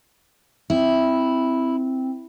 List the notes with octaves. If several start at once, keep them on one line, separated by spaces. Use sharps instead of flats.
C4 E4